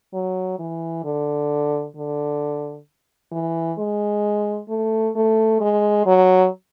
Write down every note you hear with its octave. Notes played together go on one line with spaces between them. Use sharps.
F#3
E3
D3
D3
E3
G#3
A3
A3
G#3
F#3